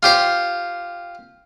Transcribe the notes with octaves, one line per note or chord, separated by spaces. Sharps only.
F4 G4 C5